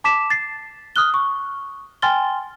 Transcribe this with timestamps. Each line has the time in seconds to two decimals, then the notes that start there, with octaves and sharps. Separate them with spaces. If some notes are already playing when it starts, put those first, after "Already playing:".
0.04 A5 D6 B6 E7
0.30 A6 C7
0.96 D#6 F6 F#6 G7
1.14 C#6
2.02 G5 G#5 C6 F6 A6 G7